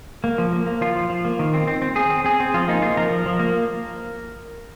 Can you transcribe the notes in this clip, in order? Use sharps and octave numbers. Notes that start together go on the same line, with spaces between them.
A#3
F3
A#3
A#3
F3 F4
F3
F3
A#3
D#3
C4
C4
C4
C4 G#4
C4
C4 G#4
C4
F3 F4
A#3 D#4
A#3 F4
F3 A#4
F3
F3
A#3